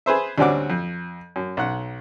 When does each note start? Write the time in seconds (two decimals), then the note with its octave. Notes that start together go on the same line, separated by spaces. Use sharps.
0.06 G#4 B4 C5 E5
0.38 D2 G3 C4 C#4 F#4 D6
0.70 F2
1.36 F#2
1.57 B1 F#5